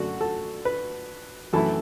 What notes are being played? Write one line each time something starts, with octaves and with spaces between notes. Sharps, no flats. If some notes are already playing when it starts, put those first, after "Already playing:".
Already playing: F#2 D3 A3 D4 F#4
A4
B4
F#2 E3 A3 E4 A4